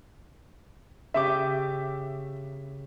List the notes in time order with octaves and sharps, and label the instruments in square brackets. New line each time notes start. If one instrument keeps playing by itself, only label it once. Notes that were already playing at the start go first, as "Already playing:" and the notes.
[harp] C#3 G4 D6 [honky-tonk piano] E5